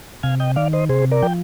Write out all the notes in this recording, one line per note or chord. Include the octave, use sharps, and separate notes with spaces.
C3 F5 G#5
D#5 G5
D#3 D5 F5
C5 D#5
C3 G#4 C5
A#4 D5
F3 G5